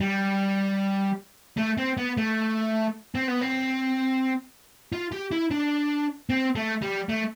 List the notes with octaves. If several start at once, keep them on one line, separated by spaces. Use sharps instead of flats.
G3
A3
C4
B3
A3
C4
B3
C4
F4
G4
E4
D4
C4
A3
G3
A3